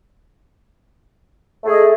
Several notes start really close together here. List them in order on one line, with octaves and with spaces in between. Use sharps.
A3 G#4 D#5